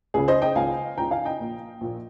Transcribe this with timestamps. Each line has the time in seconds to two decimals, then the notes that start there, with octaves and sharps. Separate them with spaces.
0.14 C#2 C#3 G#4
0.28 C5 D#5
0.42 D#5 G5
0.55 C#2 C#3 F5 G#5
0.98 C#2 C#3 G5 A#5
1.11 F5 G#5
1.25 D#5 G5
1.39 A#1 A#2
1.81 A#1 A#2